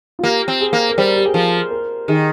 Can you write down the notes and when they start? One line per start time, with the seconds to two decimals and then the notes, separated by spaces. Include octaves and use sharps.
0.19 F4
0.23 A#3 G4
0.48 C4
0.61 G#4
0.73 A#3
0.89 A#4
0.98 G3 C5
1.16 G4
1.26 G#4
1.34 F3 A#4
1.71 A#4
2.08 D#3 G#4